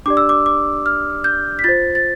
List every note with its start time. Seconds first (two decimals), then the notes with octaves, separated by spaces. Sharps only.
0.06 D4 G4 D5 D6
0.17 E6
0.29 D6
0.46 D6
0.86 F6
1.24 G6
1.59 B6
1.64 F4 C5 A6
1.95 A6